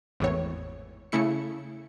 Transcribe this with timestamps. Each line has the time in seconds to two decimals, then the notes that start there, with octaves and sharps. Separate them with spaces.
0.20 G#1 E2 A2 C#5
1.12 C#3 A3 E4 C#7